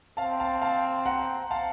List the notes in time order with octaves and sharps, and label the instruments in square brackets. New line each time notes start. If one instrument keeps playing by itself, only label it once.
[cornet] C4 [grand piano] F5 A5
[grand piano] F5 A5
F5 A5
F#5 A#5
F5 A5